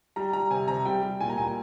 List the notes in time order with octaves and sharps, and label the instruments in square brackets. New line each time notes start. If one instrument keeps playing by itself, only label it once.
[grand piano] G3 A#5
G3 A#5
C3 G#5
C3 A#5
G3 G5
G3
A#2 G#5
A#5
A#2 G#5